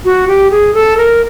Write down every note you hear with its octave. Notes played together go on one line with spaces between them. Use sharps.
F#4
G4
G#4
A4
A#4